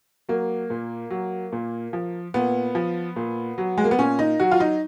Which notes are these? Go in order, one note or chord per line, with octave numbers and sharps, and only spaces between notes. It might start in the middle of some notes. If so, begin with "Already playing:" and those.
F#3 A#3
A#2
F#3
A#2
F3
A#2 B3
F3
A#2
F#3
G#3
A#3
B3
A#2 C#4
D#4
F#3 F#4
F4
D#4